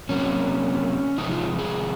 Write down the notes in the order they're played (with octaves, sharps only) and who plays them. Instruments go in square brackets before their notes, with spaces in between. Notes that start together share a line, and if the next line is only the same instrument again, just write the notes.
[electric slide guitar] C3 F#3 A#3 C#4
C3 F3 G#3 D#4
F4
G#4